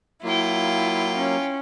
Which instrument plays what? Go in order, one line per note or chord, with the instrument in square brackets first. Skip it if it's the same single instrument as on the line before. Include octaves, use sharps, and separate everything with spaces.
[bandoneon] F#3 A#3 [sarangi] E4 [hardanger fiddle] F4 G5
[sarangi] C#4